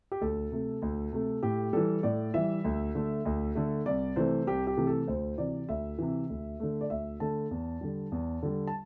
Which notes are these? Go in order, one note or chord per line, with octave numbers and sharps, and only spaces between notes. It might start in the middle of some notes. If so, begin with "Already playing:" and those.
G4
D2 A4
C3 A3
D2
C3 A3
A2 G4
E3 G3 A4
A2 D5
E3 G3 E5
D2
D3 A3
D2
D3 A3
C2 D5
C3 E3 A3 C5
C2 G4
G4
C3 E3 A3
A4
D2 C5
C3 E3 D5
D2 E5
C3 E3
D2
D3 A3
D5
D2 E5
D3 A3 A5
E2
D3 G3
E2
D3 G3
A5